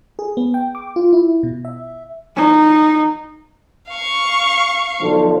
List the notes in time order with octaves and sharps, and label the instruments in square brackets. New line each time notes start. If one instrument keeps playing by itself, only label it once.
[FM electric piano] G#4
B3
G5
D6
F4
E4
B2
E5
[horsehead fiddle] D#4
[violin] F5 C#6
[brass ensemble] B1 D3 F3